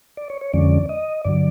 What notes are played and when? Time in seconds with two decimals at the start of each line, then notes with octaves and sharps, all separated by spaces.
0.17 D5
0.30 C#5
0.41 C#5
0.53 F2 D3 F3 G#3 C#4 D5
0.89 D#5
1.24 G2 D3 F#3 D5